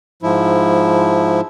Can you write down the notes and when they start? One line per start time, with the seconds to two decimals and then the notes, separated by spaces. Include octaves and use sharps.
0.23 G#2 F3 E4